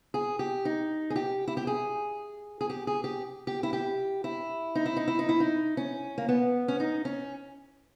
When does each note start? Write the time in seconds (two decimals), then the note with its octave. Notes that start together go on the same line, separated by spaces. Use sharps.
0.14 G#4
0.39 G4
0.65 D#4
1.10 G#4
1.16 G4
1.47 E4
1.57 G4
1.67 G#4
2.61 G#4
2.70 G4
2.87 G#4
3.04 G4
3.47 G4
3.63 E4
3.73 G4
4.24 E4
4.75 D#4
4.86 E4
4.97 D#4
5.08 E4
5.19 D#4
5.29 E4
5.40 D#4
5.77 C#4
6.18 A#3
6.29 B3
6.68 C#4
6.80 D#4
7.05 C#4